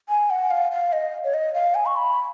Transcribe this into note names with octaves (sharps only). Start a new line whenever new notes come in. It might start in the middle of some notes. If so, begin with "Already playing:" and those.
G#5
F#5
F5
F5
D#5
C#5
D#5
F5
G#5
C#6
B5